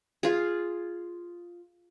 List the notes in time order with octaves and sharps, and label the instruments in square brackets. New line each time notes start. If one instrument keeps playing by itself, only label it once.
[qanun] F4 G#4